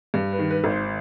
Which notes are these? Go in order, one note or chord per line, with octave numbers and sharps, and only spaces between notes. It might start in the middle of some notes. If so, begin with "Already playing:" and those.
G2
B4
D#3
B4
G#1
C5